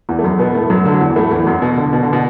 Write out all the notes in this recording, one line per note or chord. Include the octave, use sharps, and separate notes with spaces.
E2 E3
A3
F#2 F#3
B2 B3
A2 A3
F#2 F#3
D3
F#3
E2 E3
A2 A3
E2 E3
F#2 F#3
B2
D3
B2
D3
B2